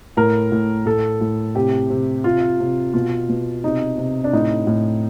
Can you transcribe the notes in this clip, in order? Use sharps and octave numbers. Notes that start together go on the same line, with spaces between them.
A2 A#4
A2
A2 A4
A2
C3 G4
C3
C3 F4
C3
B2 F4
B2
C3 D#4
C3
D4
A2 D#4
A2